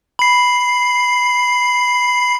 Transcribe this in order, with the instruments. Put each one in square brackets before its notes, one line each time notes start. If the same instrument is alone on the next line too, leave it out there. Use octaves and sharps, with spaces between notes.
[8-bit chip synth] B5 C7